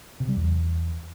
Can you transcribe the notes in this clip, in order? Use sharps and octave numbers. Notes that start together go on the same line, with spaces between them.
C3
G3
E2